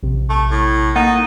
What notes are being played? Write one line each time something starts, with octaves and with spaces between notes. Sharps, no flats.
A#1 C3
A3
A2
A#3 D#4 F#5 A6